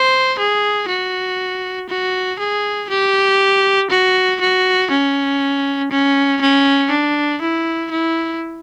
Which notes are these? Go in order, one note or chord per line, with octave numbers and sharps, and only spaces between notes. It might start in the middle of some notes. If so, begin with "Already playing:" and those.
Already playing: C5
G#4
F#4
F#4
G#4
G4
F#4
F#4
C#4
C#4
C#4
D4
E4
E4